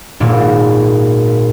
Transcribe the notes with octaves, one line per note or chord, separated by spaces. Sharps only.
G#1 A#2